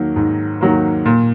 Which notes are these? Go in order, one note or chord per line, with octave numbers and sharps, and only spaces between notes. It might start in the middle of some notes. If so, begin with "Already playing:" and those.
Already playing: D#3 F#3 A#3
G#2
D#3 F#3 A#3
A#2